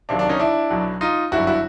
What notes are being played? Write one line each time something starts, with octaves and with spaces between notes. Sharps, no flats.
C#2 C3 D#3 F#3 D4
D4
C#4 D#4
D4 E4
B1 B2 F#3
D#4 F4
G1 F#2 D3 G3 E4 F#4
E4 F#4